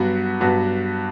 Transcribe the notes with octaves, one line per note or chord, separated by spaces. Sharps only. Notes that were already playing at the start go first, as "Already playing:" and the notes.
Already playing: G2 F#3 B3 F#4
G2 F#3 B3 F#4